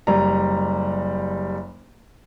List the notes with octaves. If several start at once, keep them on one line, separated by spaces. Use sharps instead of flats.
F#1 G3 A#5